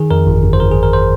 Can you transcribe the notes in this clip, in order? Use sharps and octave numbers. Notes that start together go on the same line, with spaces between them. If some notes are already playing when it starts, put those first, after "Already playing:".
Already playing: D#3 G#4
F2 A#4
G1
G1
C5
G1 A#4
G#4
G1
A#4
C5